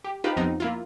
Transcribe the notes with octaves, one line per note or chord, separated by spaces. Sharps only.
G4
D#4 F4 G4 B4 C5
F2 F3 B3 C4 D#4 A#5
A#3 E4 F4